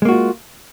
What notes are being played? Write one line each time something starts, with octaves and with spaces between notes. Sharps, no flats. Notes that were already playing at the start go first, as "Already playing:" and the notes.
G#3 A#3 F4 F#4